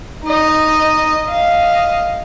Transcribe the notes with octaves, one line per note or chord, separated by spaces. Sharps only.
D#4 D#5
D#5 F5